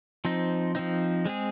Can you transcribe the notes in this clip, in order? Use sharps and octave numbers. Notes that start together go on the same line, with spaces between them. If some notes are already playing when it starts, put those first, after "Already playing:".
F3 C4 D#4
F3 C4 D#4
G#3 C4 G#4